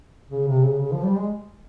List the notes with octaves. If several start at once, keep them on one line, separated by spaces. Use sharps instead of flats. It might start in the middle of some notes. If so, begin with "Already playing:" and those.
C#3
C3
C#3
C#3
F3
G3
G#3